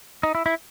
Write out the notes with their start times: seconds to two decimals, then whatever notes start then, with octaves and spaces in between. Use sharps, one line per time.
0.23 D#4
0.35 E4
0.46 E4